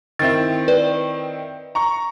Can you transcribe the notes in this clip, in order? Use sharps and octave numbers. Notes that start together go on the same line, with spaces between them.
D#3 C4 E4 A6
B4 D5
A#5 C#6